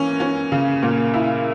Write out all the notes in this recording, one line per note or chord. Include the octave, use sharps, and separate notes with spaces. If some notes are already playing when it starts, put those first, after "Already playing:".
Already playing: E3 A#3 C#4
C#4
C#3
A#2
E4